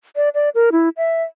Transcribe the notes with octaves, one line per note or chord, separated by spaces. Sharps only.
D5
D5
A#4
E4
E5